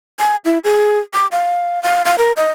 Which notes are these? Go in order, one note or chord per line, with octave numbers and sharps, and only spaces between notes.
G#5
E4
G#4
D6
F5
F5
F5
A#4
D#5